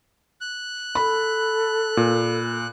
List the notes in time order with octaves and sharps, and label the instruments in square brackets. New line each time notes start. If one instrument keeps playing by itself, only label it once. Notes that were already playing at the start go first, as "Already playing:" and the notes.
[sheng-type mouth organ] F#6
[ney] A4 [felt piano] B5
[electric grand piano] A#2